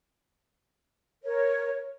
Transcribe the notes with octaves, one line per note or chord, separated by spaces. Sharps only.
A#4 C#5